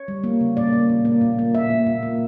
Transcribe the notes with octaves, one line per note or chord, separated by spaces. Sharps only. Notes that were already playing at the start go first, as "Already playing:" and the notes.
Already playing: C#5
G3
A#3
C#3
A#2 D5
A#3
A#2
A#3
A#2
A#3
A#2 E5
A#3
A#2
A#3